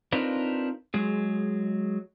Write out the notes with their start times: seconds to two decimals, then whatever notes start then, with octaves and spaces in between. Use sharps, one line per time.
0.12 C4 D4 D#4 F4 A#4 B4
0.94 F#3 G#3 G#4